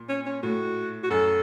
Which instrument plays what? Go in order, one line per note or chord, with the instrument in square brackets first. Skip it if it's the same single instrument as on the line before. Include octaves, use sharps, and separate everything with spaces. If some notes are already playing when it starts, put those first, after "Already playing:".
Already playing: [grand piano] A#2
[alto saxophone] C#4
C#4
[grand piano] A2 [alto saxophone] F#4
[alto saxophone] F#4
[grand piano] F#2 [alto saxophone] A4